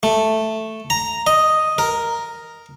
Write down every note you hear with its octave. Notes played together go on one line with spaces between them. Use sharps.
A3
A#5
D#5
A#4